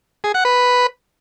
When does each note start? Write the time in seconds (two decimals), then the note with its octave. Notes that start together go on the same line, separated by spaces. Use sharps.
0.24 G#4
0.34 F#5
0.45 B4